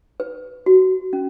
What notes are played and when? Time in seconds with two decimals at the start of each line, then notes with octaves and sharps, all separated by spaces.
0.20 B4
0.66 F#4
1.13 C#4